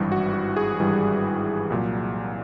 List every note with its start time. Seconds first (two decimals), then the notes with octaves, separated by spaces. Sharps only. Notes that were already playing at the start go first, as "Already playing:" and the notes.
Already playing: G#1 G2 E3 G3
0.12 F#4
0.34 F#4
0.57 G#4
0.79 G#1 G2 E3 G3
1.70 C2 A#2 F#3